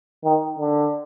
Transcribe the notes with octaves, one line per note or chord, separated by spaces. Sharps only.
D#3
D3